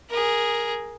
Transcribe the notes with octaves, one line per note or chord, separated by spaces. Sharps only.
G#4 A#4